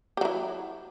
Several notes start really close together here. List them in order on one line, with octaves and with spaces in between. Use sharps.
G4 F#3 E4